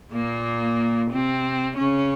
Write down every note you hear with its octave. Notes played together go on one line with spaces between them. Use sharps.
A#2 A#3
C3 C4
C#3 C#4